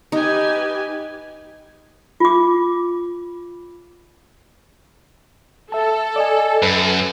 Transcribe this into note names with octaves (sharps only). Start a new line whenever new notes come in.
D#4 G4 B4 G#5
F4 D6
A4 E5 A5
D5 D#5 G#5
F#2 B4